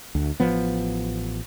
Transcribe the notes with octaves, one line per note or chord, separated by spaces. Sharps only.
D2
A1 F3 B3